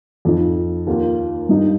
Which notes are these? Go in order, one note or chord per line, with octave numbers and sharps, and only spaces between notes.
F2 F3 D#4
D#2 D#3 A#3 F4
G2 G3 D#4